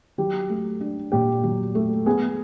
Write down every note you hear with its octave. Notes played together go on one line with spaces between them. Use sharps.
F#3 G4
A3
D4
A#2 G4
F#3
A3
B3 G#4